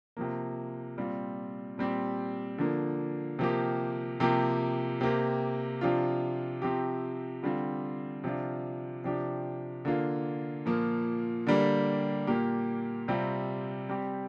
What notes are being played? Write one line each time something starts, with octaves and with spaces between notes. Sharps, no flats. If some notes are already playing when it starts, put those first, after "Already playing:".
C3 F3 A#3
A#2 G3 C4 F4
A#2 G3 C4 G4
D3 F3 A#3
C3 F3 A#3 G4
C3 F3 A#3 G4
C3 A#3 G4
C3 F3 D4 F4
C3 F3 C4 G4
D3 G3 C4 F4
C3 F3 D4 F4
C3 F3 D4 G4
D3 A#3 F4
A#2 F3 A#3
D3 G3 A#3 G4
A#2 A#3 G4
C3 G3 C4 F4
G3 C4 G4